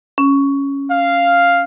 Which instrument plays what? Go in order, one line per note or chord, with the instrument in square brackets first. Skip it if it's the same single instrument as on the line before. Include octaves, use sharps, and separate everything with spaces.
[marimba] C#4
[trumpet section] F5